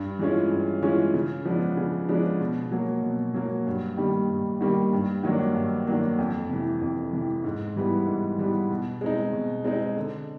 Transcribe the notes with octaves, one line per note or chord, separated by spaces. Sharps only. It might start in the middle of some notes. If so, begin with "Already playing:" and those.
Already playing: G2
E3 G#3 C#4 F4
G2
E3 G#3 C#4 F4
C#3
F3 G#3 B3 D4
C#3
F3 G#3 B3 D4
B2
F#3 A#3
B2
F#3 A#3
G2
D#3 G3 A#3
G2
D#3 G3 A#3
G2
D#3 F#3 A#3 D4
G2
D#3 F#3 A#3 D4
F2
C3 E3
F2
C3 E3
G#2
E3 G3 B3
G#2
E3 G3 B3
B2
G#3 C4 D#4
B2
G#3 C4 D#4
D3